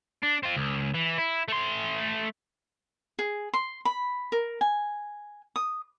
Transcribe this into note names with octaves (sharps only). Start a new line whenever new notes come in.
D4
C4 F4
C#2
E3
E4
A3 C6
G#4
C6
B5
A#4
G#5
D#6